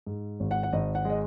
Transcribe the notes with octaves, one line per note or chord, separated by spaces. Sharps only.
G#2
G#1
F#5
F#5
G#1 D#5
F#5
G#3 D#5